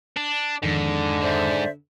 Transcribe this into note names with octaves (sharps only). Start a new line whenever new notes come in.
D4
F2 G#2 D3 D#3
G#2 C5 D5 E5